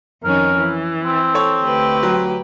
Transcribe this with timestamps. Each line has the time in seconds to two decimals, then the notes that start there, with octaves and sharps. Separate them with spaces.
0.24 F2 D#3 C#4 A#4
0.57 E3
1.04 C4
1.34 A4 C#5
1.63 D2 G4 B4
2.03 F#3